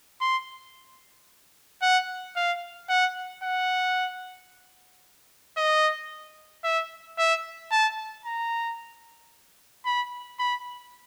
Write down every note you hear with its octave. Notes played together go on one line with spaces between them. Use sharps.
C6
F#5
F5
F#5
F#5
D#5
E5
E5
A5
A#5
B5
B5